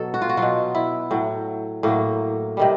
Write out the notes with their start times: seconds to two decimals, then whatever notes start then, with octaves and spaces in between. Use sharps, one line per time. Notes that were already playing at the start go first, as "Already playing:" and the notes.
Already playing: B2 F#3 A4
0.14 F#4
0.22 F4
0.29 F#4
0.37 B2 F#3 F4
0.75 E4
1.11 A2 F#3
1.83 A2 F#3 A#3
2.57 C3 D#3 G3